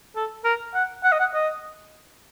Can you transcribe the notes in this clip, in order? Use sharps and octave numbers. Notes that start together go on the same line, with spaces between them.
A4
A#4
F#5
F#5
D#5
F#5
D#5